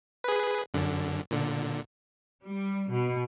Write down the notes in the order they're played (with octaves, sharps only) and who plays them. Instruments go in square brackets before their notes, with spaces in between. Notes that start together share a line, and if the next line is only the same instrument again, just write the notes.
[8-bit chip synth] G#4 B4
F#2 D3
A#2 D3
[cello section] G3
B2